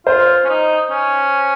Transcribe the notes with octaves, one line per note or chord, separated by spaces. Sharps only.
F4 C5
C#4
D#4
C#4